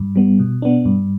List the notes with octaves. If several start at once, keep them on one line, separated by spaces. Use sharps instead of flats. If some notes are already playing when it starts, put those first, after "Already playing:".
Already playing: G2
G3 B3
B2
B3 D4
G2